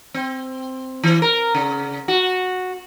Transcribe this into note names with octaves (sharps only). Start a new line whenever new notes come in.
C4
E3
A#4
C#3
F#4